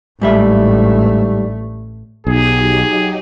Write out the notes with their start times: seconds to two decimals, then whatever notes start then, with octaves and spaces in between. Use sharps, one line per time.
0.21 A1 G#2 G3 A3 E5
2.27 B1 F#3 D#4 G4 G#4